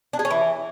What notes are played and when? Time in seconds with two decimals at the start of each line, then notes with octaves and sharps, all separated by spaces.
0.13 D4
0.19 G#4
0.25 C#4
0.31 E3